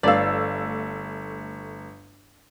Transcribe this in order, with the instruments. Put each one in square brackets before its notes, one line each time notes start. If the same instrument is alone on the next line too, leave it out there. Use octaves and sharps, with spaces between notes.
[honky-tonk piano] G1 A3 E6 [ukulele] D5 F5